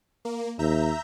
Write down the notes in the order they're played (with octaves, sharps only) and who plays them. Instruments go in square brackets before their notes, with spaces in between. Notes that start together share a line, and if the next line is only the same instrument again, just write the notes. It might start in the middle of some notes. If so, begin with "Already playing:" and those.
[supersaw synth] A#3
[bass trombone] D#2 [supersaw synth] E5 A#5 G6